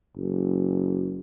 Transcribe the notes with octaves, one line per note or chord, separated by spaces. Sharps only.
F#1